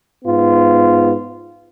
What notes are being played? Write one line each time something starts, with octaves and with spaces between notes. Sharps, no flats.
G#2 B3 F4